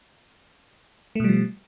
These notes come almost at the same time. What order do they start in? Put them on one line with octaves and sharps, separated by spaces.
A3 B2 G3 F3